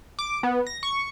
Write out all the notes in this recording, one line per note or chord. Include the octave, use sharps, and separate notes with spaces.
D6
B3
A#6
C#6